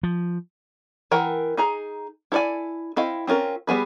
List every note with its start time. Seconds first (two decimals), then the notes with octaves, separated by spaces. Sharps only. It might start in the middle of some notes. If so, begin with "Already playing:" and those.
0.03 F3
1.11 E3 A#4 F#5 G5
1.57 D#4 G#4 A#5
2.32 E4 A4 C#5 D5 G#5
2.96 C4 E4 D#5 F5
3.27 C4 C#4 F4 A#4
3.67 G3 B3 G#4 B4